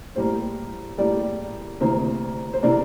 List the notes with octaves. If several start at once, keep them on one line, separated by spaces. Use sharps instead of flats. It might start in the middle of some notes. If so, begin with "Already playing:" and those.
A2 G3 A#3 C5
A2 G3 A#3 D5
D2 C3 E3 A#3 C5
C5
C3 E3 A#3 D5